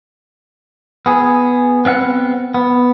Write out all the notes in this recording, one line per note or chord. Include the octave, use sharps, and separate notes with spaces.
B3 G#4
B3 C4 E5 F#5
B3